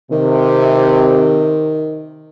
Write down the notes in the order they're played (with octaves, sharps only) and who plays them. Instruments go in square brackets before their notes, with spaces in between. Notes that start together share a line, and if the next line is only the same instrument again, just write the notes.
[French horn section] C3 [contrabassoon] D#3